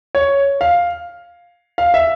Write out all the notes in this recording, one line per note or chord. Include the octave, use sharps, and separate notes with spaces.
C#5
F5
F5
E5